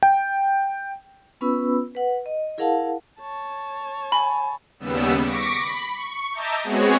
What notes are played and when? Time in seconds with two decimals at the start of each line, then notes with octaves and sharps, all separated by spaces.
0.03 G5
1.41 B3 C#4 F4 B4 B5 E6
1.95 B4 F#5
2.26 D#5
2.58 E4 G#4 A#4 F5 F#5 A5
3.20 C#5 A5
4.12 G#5 B5
4.79 D#2 C#3 G3 B3 E6
5.20 C#6 D6 A#6 B6 D7
5.58 B5
5.92 C#6
6.32 D#5 E5 A5 A#5 D6 G6
6.64 G#3 B3 C4 F#4 G#4 C#5